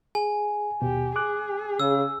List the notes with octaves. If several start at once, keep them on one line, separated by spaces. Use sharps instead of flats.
G#4 G#5
D#2 B2 G4
G#4 D6 F#6
C#3 E6